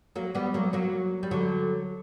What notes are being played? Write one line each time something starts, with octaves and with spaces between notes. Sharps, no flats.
F#3 A#3
G3 B3
F#3 A#3
F#3 A#3
G3
D3 F#3